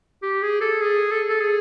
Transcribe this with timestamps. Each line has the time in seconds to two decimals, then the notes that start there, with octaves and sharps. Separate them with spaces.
0.23 G4
0.42 G#4
0.61 A4
0.81 G#4
1.11 A4
1.29 A4
1.41 G#4